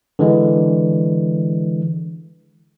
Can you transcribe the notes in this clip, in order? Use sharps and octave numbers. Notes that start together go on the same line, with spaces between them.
D3 E3 G#3